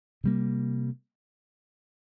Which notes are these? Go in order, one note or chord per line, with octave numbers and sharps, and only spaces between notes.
C3 G3 A#3